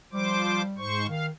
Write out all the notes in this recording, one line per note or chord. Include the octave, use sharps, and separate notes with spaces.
F3 G3 C5 D6
G#2 C5 C#6
D#3 F5